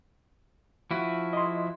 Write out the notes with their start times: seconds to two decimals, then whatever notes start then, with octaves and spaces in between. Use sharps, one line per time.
0.91 F3 E4 F#4
1.33 D#5 C6